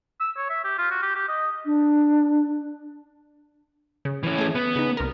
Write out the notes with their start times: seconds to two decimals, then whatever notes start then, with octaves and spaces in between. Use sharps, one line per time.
0.20 E6
0.37 C#5
0.49 E5
0.64 G4
0.78 F4
0.91 F#4
1.02 G4
1.15 G4
1.28 D#5
1.66 D4
4.05 C#3
4.23 E3 C#4
4.38 A3 G#4
4.55 B3
4.76 C#3 D#4
4.97 C2 A#4